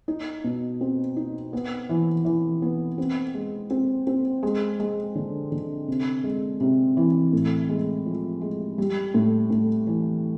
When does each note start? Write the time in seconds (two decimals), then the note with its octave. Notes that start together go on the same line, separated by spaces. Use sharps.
0.08 D#4
0.44 B2
0.81 C4
1.17 D#4
1.53 B3
1.89 E3
2.25 E3
2.62 B3
2.98 C4
3.34 G#3
3.70 C4
4.07 C4
4.43 G#3
4.80 G#3
5.15 D3
5.52 D3
5.88 C3
6.24 G#3
6.60 C3
6.97 E3
7.33 A2
7.69 G#3
8.06 F3
8.41 G#3
8.78 G3
9.14 A2
9.50 A2
9.87 E3